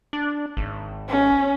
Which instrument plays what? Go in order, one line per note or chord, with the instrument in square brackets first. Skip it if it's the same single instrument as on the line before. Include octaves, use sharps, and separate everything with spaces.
[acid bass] D4
G#1
[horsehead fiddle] C#4